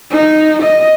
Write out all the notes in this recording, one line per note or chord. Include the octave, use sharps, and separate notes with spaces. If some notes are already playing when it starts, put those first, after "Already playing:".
D#4
D#5